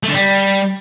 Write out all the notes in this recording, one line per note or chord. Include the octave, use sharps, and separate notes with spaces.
A3
D3
G3